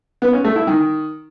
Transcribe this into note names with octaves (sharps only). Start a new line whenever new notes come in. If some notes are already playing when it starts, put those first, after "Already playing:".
B3
C#4
A3
E4
D#3